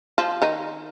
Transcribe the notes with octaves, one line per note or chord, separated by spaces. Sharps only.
F3 F4
D#3 D#4